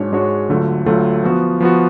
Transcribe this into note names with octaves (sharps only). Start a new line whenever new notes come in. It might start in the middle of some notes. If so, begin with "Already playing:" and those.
Already playing: G#2 G#3 D4 F#4 C#5
G#2 G#3 D4 F#4 C#5
D2 D3 F#3 A3 F4
D2 D3 F#3 A3 F4
F3 B3 F#4
F3 B3 F#4